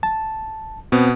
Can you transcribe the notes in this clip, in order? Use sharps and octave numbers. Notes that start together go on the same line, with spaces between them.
A5
B2 B3 C4